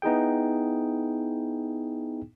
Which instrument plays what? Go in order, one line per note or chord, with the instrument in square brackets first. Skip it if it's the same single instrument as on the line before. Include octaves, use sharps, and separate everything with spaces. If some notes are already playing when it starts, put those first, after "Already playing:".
[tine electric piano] B3 D#4 E4 G#4 G5